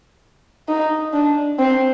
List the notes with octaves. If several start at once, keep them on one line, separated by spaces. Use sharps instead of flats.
D#4
D4
C4